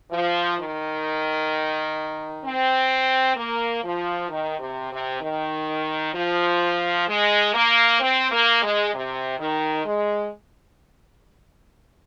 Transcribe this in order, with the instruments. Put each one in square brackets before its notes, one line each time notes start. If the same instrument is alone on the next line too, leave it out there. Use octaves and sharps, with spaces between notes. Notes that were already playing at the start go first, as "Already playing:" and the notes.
[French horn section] F3
D#3
C4
A#3
F3
D#3
C3
C3
D#3
F3
G#3
A#3
C4
A#3
G#3
C3
D#3
G#3